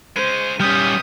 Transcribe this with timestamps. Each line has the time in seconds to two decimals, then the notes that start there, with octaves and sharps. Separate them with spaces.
0.16 G#3 C#4 C5 D#7
0.60 C3 G3 B3 C#4 D#6 F6 G6 B6